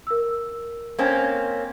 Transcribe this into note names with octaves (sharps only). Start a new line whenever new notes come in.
A#4 E6
A#3 C4 C#4 C5